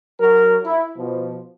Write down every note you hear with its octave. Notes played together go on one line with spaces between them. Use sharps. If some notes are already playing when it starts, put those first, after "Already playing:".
F#3 A#4
E4
B2 F3